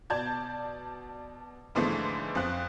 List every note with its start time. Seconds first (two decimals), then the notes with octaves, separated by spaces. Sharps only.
0.10 B2 D5 A5 G6 G#6
1.75 G#2 D3 E3 F3 G#3 A3
2.35 F2 F3 F#6